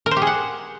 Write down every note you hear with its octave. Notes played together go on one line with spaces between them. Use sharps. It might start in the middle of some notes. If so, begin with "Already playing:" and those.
A#4
C5
G4
G#4
F#5